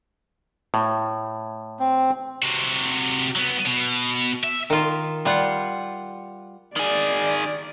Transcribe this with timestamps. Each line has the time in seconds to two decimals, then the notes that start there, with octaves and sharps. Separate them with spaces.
0.74 A2
1.80 C4
2.42 C3 F#4
3.36 F#3 B3
3.66 B2
4.44 E5
4.70 D#3 F4
5.25 G3 F4 F#5
6.76 D#3 G#4 D5